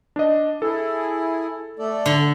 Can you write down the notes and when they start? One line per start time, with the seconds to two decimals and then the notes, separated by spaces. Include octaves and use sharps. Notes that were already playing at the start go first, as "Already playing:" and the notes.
0.16 D4 D#5
0.62 E4 G#4 A4
1.79 A3 A4 D5
2.06 D3